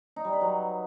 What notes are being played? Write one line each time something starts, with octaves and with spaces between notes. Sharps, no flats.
D#4
G3
B4
F#3